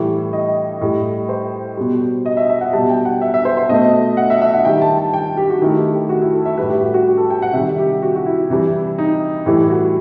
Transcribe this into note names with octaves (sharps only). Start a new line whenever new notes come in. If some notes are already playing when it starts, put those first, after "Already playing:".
Already playing: A2 E3 G3
D#5
A2 G3
C5
B2 G3
D#5
E5
E5
F#5
B2 G3 A5
G5
F#5
E5
E5
C5
C5
B2 A3 D#5
E5
F#5
E5
E5
F#5
D#3 G3 G5
A5
A5
G5
G4
F#4
D#3 A3 E4
G4
G4
F#4
E4
A4
E5
A2 G3 B4
G4
F#4
F#4
G4
A4
G5
F#5
C3 D#3 G3 E5
G4
F#4
F#4
E4
C3 E3 G3
D#4
A2 E3 G3 E4
F#4